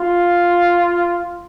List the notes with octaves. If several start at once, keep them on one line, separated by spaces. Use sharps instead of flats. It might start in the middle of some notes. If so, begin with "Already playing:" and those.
Already playing: F4